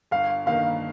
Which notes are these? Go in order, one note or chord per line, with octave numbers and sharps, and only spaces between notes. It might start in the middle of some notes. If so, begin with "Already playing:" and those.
G1 F5
G2 D#3 A#3 F5